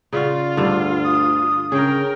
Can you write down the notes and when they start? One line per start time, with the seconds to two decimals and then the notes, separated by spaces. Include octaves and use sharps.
0.13 C#3 F4 F#4 D5
0.57 D2 G2 D3
1.04 D#6
1.72 C#3 G#4 A#4 G5